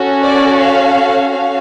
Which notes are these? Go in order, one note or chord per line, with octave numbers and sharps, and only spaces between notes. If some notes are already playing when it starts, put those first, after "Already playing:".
Already playing: C#4 F#4 A4
D5
F5
C#4 F#4 A4 F5